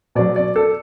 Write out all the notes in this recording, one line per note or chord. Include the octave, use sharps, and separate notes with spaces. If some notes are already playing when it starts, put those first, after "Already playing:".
B2 F#3 D5
D5
A4